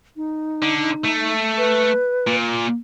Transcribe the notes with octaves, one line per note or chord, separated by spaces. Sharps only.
D#4
D3
A3
B4
A#2